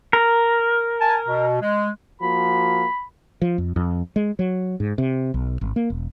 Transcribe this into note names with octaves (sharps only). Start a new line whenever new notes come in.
A#4
G#5 A5
B2
G#3
F3 A#3 F#4 B5
F3
F2
F2
G#3
F#3
G#2
C3
B1
G#1
A#3
E1